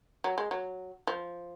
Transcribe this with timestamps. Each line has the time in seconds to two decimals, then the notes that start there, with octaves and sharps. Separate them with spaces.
0.24 F#3
0.38 G#3
0.51 F#3
1.07 F3